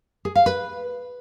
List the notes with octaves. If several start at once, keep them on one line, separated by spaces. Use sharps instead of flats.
G#4
F5
B4